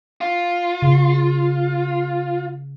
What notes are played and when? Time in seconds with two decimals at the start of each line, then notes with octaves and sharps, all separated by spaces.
0.21 F4
0.82 C#3